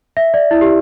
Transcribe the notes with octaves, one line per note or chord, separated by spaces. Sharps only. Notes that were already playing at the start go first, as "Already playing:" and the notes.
E5
D5
E4
G4